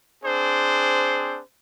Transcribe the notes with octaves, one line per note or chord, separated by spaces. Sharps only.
C4 D4 G#4 C5